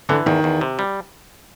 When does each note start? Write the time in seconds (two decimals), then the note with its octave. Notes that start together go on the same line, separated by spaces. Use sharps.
0.09 D3 E3
0.26 E2 D#3
0.44 E2
0.61 C3
0.79 G3